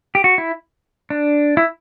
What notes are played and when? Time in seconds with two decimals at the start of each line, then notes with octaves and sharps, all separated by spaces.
0.15 G4
0.24 F#4
0.38 E4
1.10 D4
1.57 E4